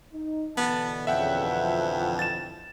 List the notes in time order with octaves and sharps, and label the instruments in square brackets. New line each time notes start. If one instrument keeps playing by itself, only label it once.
[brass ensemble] D#4
[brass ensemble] B2 D3 E3 [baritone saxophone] B3 [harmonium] A5
[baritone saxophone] F2 [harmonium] C#3 [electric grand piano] E5 F#5 G5
[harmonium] F3
[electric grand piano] A6 E7